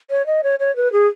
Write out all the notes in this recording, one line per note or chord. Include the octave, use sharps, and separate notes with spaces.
C#5
D#5
C#5
C#5
B4
G#4